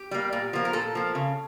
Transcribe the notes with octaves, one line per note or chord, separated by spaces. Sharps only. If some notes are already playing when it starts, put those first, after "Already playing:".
Already playing: G4
G3 A#3
A#2
F3 A#3
A#4
A#2 A4
F3 A#3
C#3